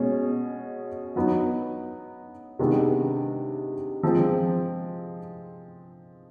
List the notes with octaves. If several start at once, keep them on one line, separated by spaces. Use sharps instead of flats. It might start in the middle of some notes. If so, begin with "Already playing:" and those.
Already playing: B2 G#3 C#4
F#3 B3 D#4
C3 D#3 G#3 B3 D4
F3 G#3 C4